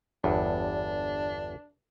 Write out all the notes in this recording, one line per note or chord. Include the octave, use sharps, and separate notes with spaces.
G1 E2 G2 D4